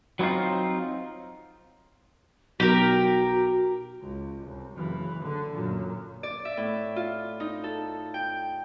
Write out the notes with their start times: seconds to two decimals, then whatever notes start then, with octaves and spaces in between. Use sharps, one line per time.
0.19 F#3 B3 C4 D#4 F4
2.60 B1 F#4 G4 A#4
4.01 C#2
4.46 C2
4.76 F#1 E3
5.23 D3
5.54 F#2 A#2
6.23 D5
6.45 E5
6.57 A2
6.96 F4
7.40 D#4
7.64 A4
8.14 G5